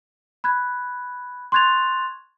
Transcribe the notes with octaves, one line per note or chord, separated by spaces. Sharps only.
B5 F#6 G#6
C6 C#6 F#6 G#6 A6 F7